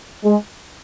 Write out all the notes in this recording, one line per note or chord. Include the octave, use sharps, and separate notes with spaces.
G#3